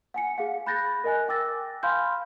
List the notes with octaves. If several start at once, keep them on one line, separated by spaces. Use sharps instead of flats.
F#5 G#5 C#7
G#4 F5 F#5
B5 F#6 G6 A6 A#6
A#4 D#5 G#5 F#6
G5 D6 E6 A6 A#6
F5 G#5 B5 C6 F6 G6